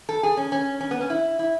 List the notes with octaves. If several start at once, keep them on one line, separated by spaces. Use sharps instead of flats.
A4
G#4
C#4
C#4
C#4
B3
C#4
E4
E4